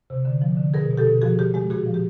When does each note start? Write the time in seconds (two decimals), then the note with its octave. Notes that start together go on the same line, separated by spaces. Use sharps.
0.10 C3
0.25 D3
0.42 F3
0.57 D3
0.74 B2 G#4 A#4
0.91 B2
0.97 G4 A4
1.06 B2
1.22 F3 F#4 G#4
1.39 C#3 G4
1.54 G#3 G4
1.70 A#2 F#4 G#4
1.87 F3
1.94 G4